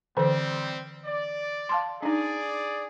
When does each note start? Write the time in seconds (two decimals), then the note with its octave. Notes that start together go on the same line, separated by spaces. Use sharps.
0.17 D3 E3 G3 C4 C5
1.06 D5
1.69 F5 A5 C6
2.02 D4 D#4 G#4 D5